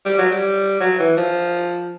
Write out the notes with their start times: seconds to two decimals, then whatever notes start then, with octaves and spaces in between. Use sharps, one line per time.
0.05 G3
0.18 F#3
0.31 G3
0.80 F#3
0.99 E3
1.17 F3